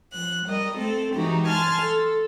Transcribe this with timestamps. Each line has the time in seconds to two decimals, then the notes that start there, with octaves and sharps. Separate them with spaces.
0.12 F3 F#6
0.44 G3 A#4 D#5
0.77 A3 C4 A4
1.12 E3 G#3 D#4 F#4 G4
1.47 G#5 A5 C6 F6
1.82 A4